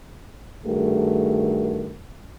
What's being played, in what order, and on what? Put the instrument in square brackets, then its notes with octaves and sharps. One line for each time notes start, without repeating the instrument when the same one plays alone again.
[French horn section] G2 D#3 A3 F#4 G#4 A#4